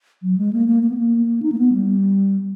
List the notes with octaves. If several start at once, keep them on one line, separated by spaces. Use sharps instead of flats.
F#3
G#3
A#3
A#3
A#3
B3
A#3
D#4
A#3
B3
G3